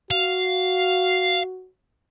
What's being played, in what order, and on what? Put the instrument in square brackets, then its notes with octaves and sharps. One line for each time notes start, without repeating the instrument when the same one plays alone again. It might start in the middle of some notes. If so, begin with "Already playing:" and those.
[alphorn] F#4 [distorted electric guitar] F5